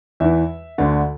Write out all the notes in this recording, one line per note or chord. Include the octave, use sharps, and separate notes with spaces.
E2 E3 E5
D2 D3